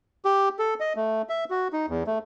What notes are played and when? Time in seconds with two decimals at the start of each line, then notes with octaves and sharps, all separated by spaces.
0.25 G4
0.59 A4
0.80 D#5
0.96 A3
1.29 E5
1.50 F#4
1.73 D#4
1.88 E2
2.07 A3